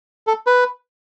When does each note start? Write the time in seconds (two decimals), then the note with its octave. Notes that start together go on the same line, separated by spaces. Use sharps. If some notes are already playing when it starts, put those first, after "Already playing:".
0.27 A4
0.47 B4